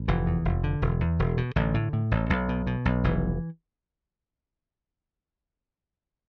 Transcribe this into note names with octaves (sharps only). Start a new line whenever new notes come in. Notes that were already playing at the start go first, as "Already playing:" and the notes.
Already playing: A1
F1 E3
E2
F1
D3
E1
E2
E1
B2
A1 D3
A2
A2
A1
B1
B2
B2
B1
F1 E3